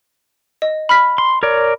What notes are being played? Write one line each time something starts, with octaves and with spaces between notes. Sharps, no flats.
D#5
B5 F6 B6
C6
A#4 C#5 D5